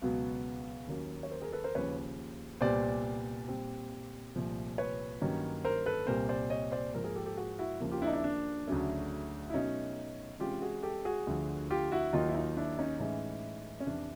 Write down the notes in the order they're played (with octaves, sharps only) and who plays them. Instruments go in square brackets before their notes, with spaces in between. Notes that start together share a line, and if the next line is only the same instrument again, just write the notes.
[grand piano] C#2 B2 F#3 B3
D#2 D#3 F#3 A#3 C#4
C#5
A#4 C5
G#4 A#4
A4 B4
A#4 C5
D#2 C#3 F3 B4 C#5
C2 A#2 G3 B3 C5 D5
A#2 G3 C4
C2 A#2 F3 A3
B4 C#5
G2 D#3 F#3 A#3 C#4
A#4 C5
A4 B4
C2 A#2 G3 C4 A#4 C5
C5 D5
C#5 D#5
C5 D5
G#2 F3 A#3 A#4 C5
G#4 A#4
G4 A4
G4 A4
F#4 G#4
E4 F#4
D#2 C#3 F3 A#3
F4 G4
D4 E4
D#4
D4 E4
D4
D2 C#3 F#3 A3 C#4
E4
B2 F#3 A3 C#4 D#4
C3 E3 G#3 C#4 F4 G4
F#4 G#4
G4 A4
F#4 G#4
D2 D3 F3
F4 G4
E4 F#4
D#2 D#3 F#3 D#4 F4
E4
D#4 F4
D4 E4
C#4 D#4
A2 E3 G#3 C#4 D#4
C#4
F2 C3 E3 D4